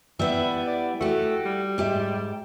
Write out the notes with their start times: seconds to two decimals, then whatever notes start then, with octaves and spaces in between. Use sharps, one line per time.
0.19 G3 B3 E4 E5
0.67 D5
1.01 A3 F#4 G4
1.46 G3
1.78 G#2 G4 E5